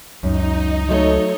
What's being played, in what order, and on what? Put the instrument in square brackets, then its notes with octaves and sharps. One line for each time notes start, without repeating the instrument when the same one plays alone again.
[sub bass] C#2 [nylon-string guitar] F#2 [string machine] D#4
[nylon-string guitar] F#3 A3 [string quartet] A4 C#5 D#5